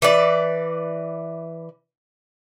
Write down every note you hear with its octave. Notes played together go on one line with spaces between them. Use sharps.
E3 B4 D5